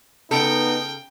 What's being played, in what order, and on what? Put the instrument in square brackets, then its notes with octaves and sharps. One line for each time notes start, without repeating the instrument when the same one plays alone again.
[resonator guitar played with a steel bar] C#3 A4 [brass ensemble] B3 D#4 [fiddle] G5